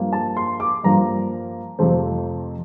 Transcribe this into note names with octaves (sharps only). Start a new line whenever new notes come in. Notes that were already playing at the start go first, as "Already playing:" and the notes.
Already playing: G2 F3 A#3
A5
C6
D6
G2 F3 A#3 A#5
F2 C3 F3 A3 C4